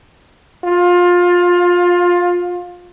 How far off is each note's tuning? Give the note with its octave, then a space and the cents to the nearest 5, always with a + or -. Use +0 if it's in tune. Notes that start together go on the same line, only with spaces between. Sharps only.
F4 +20